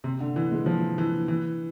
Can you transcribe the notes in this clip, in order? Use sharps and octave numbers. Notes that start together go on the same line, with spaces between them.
C3
D3
E3
G#3
F3
E3
E3